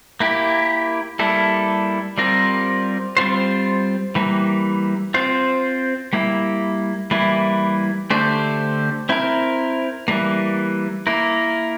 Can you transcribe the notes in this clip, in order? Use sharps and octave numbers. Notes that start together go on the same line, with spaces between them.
A#3 E4 G4
G3 A#3 E4 A4
G3 C4 F4 A#4
G3 C4 F4 C5
E3 G3 A#3
C4 F4 C5
G3 A#3 E4
E3 G3 A#3 E4
D3 A3 D4 G4 C5
C4 E4 A#4
E3 G3 A#3
A#3 E4 A#4